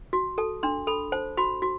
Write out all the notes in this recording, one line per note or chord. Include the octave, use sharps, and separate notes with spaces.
F#4
A4 A5
D4 C6
A4 B5
C5 A5
F#4 B5
F#4